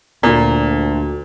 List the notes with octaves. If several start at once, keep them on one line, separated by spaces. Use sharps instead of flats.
D2 A#2